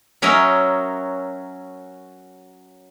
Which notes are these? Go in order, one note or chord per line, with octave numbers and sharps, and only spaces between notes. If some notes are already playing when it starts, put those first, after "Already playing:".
F#3 C#4 A#4 D#5 E5